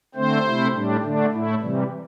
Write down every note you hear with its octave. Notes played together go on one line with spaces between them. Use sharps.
D3 A3 C4 C5
C3 A3 E4
A2 G3 D4
D3 A3 D4
A2 A3 E4
C3 E3 G3